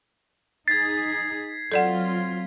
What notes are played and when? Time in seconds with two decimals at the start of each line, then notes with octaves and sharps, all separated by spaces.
0.68 D#4 G#4 G#6 A6 B6 C7
1.72 F#3 C4 F4 A4 D5 F#5